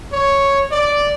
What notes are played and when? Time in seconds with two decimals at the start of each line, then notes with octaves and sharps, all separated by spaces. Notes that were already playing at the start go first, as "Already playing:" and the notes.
0.12 C#5
0.71 D5